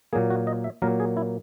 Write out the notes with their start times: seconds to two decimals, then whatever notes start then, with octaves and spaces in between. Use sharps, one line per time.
0.13 A#2 F#3 A#3 G#4
0.30 F#4
0.47 D#5
0.64 E5
0.82 A#2 F#3 A#3 A#4
1.00 G#4
1.17 E4